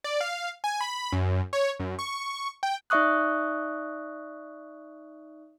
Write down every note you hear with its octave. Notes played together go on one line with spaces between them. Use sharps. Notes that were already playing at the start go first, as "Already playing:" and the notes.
D5
F5
G#5
B5
F#2
C#5
F#2
C#6
G5
D#4 D5 E5 C#6 D#6 F#6